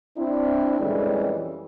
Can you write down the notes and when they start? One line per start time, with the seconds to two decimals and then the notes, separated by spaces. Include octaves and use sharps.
0.18 C4 D4 E4
0.80 F2 A#2 E3 G3 G#3 C#4